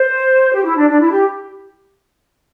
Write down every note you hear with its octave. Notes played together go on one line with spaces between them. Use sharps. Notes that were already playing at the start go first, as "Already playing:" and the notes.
Already playing: C5
G4
E4
D4
D4
E4
G4